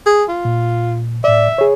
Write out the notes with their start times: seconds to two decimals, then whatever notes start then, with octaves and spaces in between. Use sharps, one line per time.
0.06 G#4
0.29 F4
0.45 A#2
1.24 A2 D5 E5
1.58 G#4 C#5